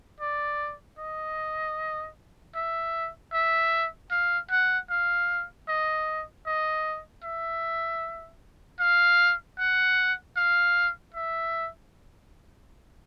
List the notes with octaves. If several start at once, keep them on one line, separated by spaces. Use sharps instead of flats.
D5
D#5
E5
E5
F5
F#5
F5
D#5
D#5
E5
F5
F#5
F5
E5